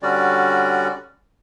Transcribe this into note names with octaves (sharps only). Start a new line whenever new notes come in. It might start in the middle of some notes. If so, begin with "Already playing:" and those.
D3 G3 C#4 F#4 D5